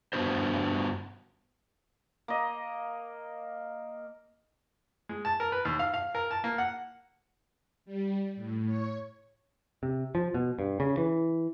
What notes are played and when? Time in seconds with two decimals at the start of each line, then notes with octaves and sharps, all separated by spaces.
0.13 G2 D#3 B3 D4 F#4 C5
2.28 A#3 D#5
5.09 G#3
5.25 A5
5.40 A#4
5.52 B4
5.65 D#2
5.79 F5
5.94 F5
6.15 A#4
6.31 A5
6.44 A#3
6.58 F#5
7.85 G3
8.36 A2
8.66 C#5
9.83 C3
10.15 F3
10.34 B2
10.59 G2
10.80 C#3
10.97 E3